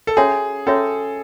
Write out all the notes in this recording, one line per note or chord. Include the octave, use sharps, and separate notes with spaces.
A4
C#4 F#4 G#4 C#5 E5
C#4 F#4 A4 C#5 E5